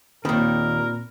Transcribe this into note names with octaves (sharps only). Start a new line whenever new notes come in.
D#2 A#2 D#3 A#3 C4 A#4 B5